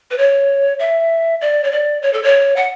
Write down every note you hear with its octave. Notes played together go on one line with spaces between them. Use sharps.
B4
C#5
E5
D5
C#5
D5
C#5
A4
C#5
F#5